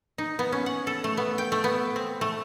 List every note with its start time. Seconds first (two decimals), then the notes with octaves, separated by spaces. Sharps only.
0.18 D#4
0.39 B3
0.52 C#4
0.66 F#5
0.87 A4
1.04 A3
1.17 B3
1.38 G5
1.52 A3
1.64 B3
1.96 C4
2.21 A3